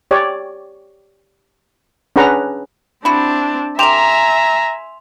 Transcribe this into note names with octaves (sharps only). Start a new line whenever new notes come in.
G4 C#5 D5
C#4 D4 G#4 B4 F#5 A#5
C4 D4 E4 F#4
G4 A#4 E5 G#5 A#5 C6 E7 F7